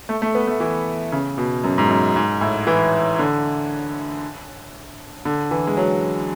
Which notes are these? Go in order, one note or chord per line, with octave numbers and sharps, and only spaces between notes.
A3
A3
B3
A3
E3
C#3
B2
F#2
G#2
F#2
G#2
A2
E3
D3
D3
E3
G#3
F#3